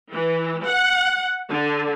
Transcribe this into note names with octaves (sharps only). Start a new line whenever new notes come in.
E3
F#5
D3